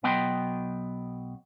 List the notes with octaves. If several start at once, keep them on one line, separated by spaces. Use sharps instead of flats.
B1 F#3 B3 D#5 G5 C6